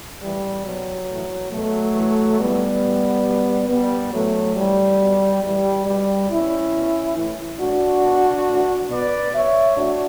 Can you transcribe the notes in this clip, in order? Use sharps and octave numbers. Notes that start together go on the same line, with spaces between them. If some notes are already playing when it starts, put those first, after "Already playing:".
A2 E3 G3
B2 F#3
A2
E3
B2 F#3 A3
A2 E3
A2 E3 G3 B3
A2 E3
B2
B2 G3 B3
A2 E3 F#3 A3
A2 E3 G3
B2
A2 E3 G3
B2 G3
B2 C#4 E4
B2
A2 E3
A2 E3 D4 F#4
B2
A2 E3
B2 B4 D5
B2 C#5 E5
A2 D4 F#4